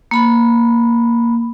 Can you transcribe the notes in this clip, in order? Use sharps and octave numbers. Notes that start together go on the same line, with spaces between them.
A#3 B5